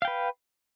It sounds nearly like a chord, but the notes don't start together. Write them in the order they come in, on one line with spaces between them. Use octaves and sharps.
F5 G5 B4